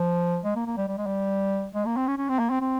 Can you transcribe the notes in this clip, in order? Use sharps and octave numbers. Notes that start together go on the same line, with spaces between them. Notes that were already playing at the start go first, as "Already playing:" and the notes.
Already playing: F3
G#3
A#3
A#3
G3
G3
G#3
G3
G#3
A#3
C4
C#4
C#4
C4
A#3
C4
C4